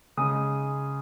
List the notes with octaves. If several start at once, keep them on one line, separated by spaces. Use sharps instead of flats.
C#3 G#3 C#4 D#6